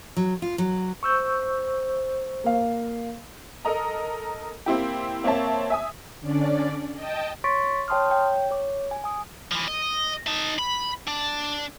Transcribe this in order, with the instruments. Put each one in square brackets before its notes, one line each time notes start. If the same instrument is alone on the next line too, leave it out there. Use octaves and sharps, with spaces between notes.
[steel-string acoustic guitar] F#3
F4
F#3
[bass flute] C5 [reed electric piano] C#6 E6 G6
[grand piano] A#3 F5
[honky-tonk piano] A4 A#4 D#5 A#5
A#3 C4 E4 G4
A#3 C4 C#5 E5 A5
E5 G#5 D#6
[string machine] D3 C#4 D4 D5
D#5 G5 A5
[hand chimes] C#5 C6 C#6 A6 B6 D7
C#5 G5 A5 C6 D#6 F6
C#5 G5
C#5 D6
G#5
G#5 D#6
[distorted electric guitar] E3 F3
D#5
D#4 A5
B5
D4